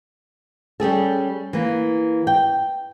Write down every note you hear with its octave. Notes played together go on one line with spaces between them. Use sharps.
G3 C#4 G#4 A4
E3 A#3
G5